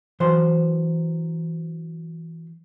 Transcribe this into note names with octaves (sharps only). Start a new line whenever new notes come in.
E3 F#3 C5 C6